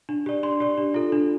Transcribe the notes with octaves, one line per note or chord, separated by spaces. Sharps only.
D4
G4 D5
D4 C6
G4 D5
D4
F4 A4
D4